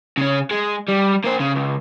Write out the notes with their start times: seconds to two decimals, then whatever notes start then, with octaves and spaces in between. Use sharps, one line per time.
0.17 C#3 C#4
0.51 G#3
0.89 G3
1.25 A#3 C5
1.40 C#3
1.56 C#2